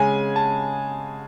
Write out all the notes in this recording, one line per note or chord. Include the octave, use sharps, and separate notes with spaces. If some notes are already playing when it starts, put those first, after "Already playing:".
Already playing: C#3 G#3 G#5
A5